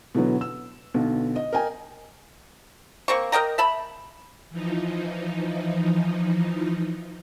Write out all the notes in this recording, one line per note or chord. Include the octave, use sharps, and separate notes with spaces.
B2 D3 E3 F#3 B3
E6
B1 B2 D3
D#5
A#4 D#5 G5 G#5
A#3 C4 C#6
A#4 D#5 G5 A#5
E5 A5 B5
E3 F3 D#4